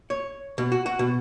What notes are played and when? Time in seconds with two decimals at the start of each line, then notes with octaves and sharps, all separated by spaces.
0.10 C#5
0.58 B2
0.72 F#4
0.86 F#4
0.99 B2